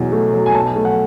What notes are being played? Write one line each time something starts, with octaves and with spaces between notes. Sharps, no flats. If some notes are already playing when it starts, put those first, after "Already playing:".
Already playing: E2 B2 F#3
A3
F#3
G#5
B1 A5
A3
F#5